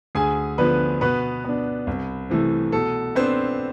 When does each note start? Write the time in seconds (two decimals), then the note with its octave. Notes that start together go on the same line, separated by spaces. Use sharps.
0.15 D2 G#4 G#5
0.58 D3 F3 B3 B4
1.01 B2 B3 B4
1.45 B3 D4
1.87 C2
2.30 C3 E3 A3
2.72 B2 A4
3.15 B3 C4 D4 C5